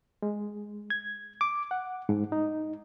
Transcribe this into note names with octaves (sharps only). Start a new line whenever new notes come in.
G#3
G#6
D6
F#5
G#2
D#4